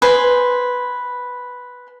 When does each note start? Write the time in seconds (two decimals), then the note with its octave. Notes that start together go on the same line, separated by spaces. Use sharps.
0.02 B4 C5 G#5